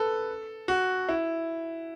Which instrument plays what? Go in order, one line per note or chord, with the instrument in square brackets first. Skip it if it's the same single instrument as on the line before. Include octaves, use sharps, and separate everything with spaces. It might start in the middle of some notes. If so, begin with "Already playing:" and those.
Already playing: [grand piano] A4 B4
F#4
E4